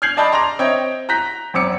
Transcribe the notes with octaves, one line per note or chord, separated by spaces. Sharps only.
F6 G6 G#6 C7 F7 F#7
D5 D#5 A5 B5 G6
A#5 C6 D6 A#6 F7
C4 C#5 D#5 E5 G5
A#5 F#6 G6 A#6 B6
G#1 F#2 C4 D6 E6 C#7